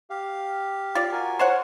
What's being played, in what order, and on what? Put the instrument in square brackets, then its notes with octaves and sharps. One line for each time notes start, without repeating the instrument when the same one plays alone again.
[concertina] G4 F5
[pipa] F4 D5
[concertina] F#4 A#4 G#5
[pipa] C5 C#5 F#5